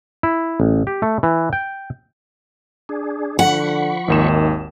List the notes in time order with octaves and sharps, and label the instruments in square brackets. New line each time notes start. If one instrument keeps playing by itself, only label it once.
[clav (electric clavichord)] E4
A1
G4
A3
E3
G5
[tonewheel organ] D4 G#4
[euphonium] D3 [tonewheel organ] F3 B5 C#6 [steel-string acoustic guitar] F#5
[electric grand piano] G#1 D#2 E7 [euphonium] D#3